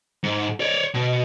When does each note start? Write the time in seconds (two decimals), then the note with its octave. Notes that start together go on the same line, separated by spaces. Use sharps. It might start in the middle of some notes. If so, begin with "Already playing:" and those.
0.23 G#2
0.60 C#5 D5
0.94 B2